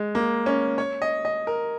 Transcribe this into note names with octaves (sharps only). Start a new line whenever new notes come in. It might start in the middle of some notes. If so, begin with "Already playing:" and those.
Already playing: G#3
A#3
C#4
C#5
D#5
D#5
A#4